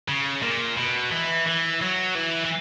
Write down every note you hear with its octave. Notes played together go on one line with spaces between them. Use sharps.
C#3
A#2
B2
E3
E3
F#3
E3
E3